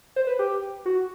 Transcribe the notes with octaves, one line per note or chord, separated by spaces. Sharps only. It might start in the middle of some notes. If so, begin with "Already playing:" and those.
C5
B4
G4
F#4